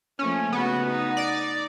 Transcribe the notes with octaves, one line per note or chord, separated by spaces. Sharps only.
F3 A3 A#3 C#4
C#3 B3 F#4
D#4
D5